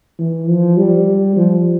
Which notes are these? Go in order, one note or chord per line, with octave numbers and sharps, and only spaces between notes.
E3
F3
G3
F3